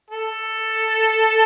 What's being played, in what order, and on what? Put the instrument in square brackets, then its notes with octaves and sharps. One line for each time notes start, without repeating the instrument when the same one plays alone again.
[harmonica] A4